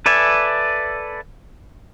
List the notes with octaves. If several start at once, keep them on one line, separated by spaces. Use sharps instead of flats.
A4 B4 D5 E5 G#5